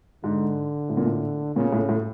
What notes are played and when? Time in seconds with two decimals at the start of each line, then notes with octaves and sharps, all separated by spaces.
0.24 G#2 D3
0.89 A2
0.97 A#2
1.05 A2
1.56 A#2 C#3
1.72 A2
1.89 A2